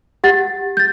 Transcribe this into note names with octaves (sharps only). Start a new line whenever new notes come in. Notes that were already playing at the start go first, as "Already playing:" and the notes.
G4 F#5 A6
G6 A6